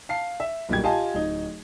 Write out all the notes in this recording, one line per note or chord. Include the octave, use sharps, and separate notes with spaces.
F5 A5 C7
E5
B1 A#2 G3 G4 G#6
F4 G4 D#5 F5 G#5 A5
D1 D#4